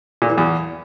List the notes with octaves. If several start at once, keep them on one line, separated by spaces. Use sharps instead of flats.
A#2
E3
E2